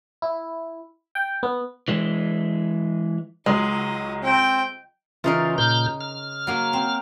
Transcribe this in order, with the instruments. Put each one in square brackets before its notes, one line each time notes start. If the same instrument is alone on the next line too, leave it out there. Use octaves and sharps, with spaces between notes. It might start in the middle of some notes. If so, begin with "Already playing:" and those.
[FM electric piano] E4
G5
B3
[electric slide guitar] E3 G#3
[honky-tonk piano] C#2 F#3 [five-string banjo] G#3 [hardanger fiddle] D#5
[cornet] C4 [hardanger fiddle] G5
[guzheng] C#3 D#4 A#4 [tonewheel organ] E3 F4
[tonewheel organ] A#2 F6 G6
F6
[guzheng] F#3 A#3
C4